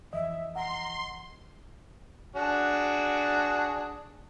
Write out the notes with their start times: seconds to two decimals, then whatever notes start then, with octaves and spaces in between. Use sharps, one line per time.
0.13 F2 E3 D#5 E5
0.55 F#5 A#5 C6
2.36 D4 F#4 G#4